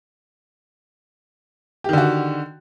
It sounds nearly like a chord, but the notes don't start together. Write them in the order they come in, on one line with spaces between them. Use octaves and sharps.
G4 D#3 D3 F#4